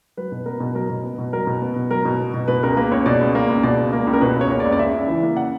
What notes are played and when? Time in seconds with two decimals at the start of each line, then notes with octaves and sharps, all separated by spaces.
0.17 F#3 B4
0.32 B2
0.46 B3 A#4
0.60 B2
0.75 F#3 A#4
0.90 B2
1.04 B3
1.18 B2
1.33 F#3 A#4
1.47 B2
1.62 B3
1.76 B2
1.90 F#3 A#4
2.05 B2
2.20 B3
2.34 B2
2.48 B2 B4
2.63 C#2 A#4
2.77 A#3 B4
2.91 C#2 C#5
3.06 B2 D5
3.21 C#2
3.35 A#3
3.49 C#2
3.63 B2 D5
3.78 C#2
3.93 A#3
4.07 C#2
4.13 A#4
4.21 B2 B4
4.36 C#2 C#5
4.51 A#3
4.60 D5
4.65 C#2
4.72 D5
4.79 C#3 E5
4.94 C#2
5.08 E3
5.23 A#3
5.36 C#3 F#5